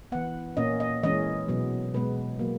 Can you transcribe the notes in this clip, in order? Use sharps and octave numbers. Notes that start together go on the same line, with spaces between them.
E3 B3 F#5
A#2 A#3 C#4 D#5
D#5
E3 G#3 C#4 D#5
B2 F#3 B3
B2 G#3 B3 B4
F#3 A#3